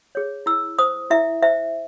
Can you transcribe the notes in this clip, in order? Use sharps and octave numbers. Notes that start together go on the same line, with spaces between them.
G#4 C#5
E4 E6
C5 D#6
E4 E5
C5 E5